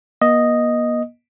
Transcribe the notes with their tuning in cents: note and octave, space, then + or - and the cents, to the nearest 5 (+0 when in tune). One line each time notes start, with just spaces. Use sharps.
A#3 +45 D#5 +0